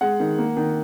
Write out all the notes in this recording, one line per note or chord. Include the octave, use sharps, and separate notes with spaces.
G#3 F#5
D#3
A#3
D#3